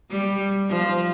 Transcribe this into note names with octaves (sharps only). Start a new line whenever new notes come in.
G3
F3